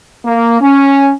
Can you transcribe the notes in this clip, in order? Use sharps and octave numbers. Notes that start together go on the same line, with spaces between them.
A#3
C#4